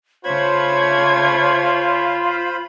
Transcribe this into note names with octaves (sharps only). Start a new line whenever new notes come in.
C#3 A3 F4 C5 C#5 B5 G#6